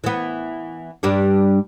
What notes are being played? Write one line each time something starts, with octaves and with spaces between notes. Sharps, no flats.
E3 B3
G2 G3 D4